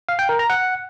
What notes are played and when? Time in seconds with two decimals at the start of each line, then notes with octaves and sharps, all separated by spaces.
0.09 F5
0.19 G5
0.29 A#4
0.39 A#5
0.50 F#5